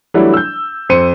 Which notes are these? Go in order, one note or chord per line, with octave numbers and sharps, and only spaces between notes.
E3 F#3 G3 A3 D4 E4
E6 G6
F2 C5 C#7 D#7